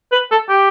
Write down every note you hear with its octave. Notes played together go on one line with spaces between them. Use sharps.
B4
A4
G4